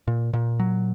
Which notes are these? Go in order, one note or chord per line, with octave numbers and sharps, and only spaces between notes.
A#2
A#2
F#3